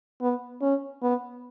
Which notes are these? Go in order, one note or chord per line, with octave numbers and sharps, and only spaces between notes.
B3
C#4
B3